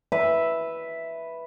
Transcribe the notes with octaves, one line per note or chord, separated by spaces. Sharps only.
B4 E5